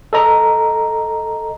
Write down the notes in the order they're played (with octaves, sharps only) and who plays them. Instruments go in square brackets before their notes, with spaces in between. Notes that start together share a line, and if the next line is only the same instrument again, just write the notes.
[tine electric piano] A4 D#5 A#5